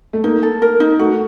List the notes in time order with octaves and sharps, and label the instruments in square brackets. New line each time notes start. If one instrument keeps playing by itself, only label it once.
[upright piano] A3
[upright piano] A#3 [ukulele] D#4
[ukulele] A4
A#4
D#4
[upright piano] A3 [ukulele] F#4